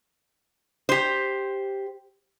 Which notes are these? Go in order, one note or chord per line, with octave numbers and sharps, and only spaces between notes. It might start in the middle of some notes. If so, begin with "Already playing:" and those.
G4 C5